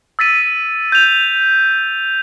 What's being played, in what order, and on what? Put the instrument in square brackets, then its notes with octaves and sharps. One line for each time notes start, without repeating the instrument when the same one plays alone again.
[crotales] E6 A6 B6 D#7
G6 F7